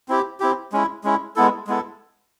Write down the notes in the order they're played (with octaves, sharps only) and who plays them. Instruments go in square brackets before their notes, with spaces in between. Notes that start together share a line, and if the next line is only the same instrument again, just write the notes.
[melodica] C4 E4 G4
C4 E4 G4
G#3 C#4 E4
G#3 C#4 E4
G#3 B3 E4 A4
G#3 B3 E4 A4